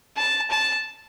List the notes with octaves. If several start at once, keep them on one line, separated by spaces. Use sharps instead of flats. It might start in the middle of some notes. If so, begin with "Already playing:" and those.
A5
A5